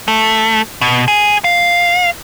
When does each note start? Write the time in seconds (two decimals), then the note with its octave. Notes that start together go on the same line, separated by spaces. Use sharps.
0.08 A3
0.81 B2
1.08 G#4
1.44 F5